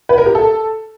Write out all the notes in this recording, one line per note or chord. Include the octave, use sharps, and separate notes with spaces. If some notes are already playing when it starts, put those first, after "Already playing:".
B4
A#4
G4
A4